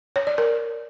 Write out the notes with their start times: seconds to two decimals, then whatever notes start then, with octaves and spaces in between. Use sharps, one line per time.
0.16 C#5
0.27 D5
0.38 A#4